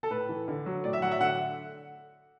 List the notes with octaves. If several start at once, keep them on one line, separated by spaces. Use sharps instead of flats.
A4
A2 B4
E3
D3
F#3
A2 D5
E5
F#3 F#5
E5
D3 F#5